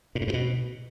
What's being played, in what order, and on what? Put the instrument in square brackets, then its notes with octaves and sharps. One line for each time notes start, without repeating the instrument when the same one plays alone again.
[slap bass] A#2
A2
G#2
B2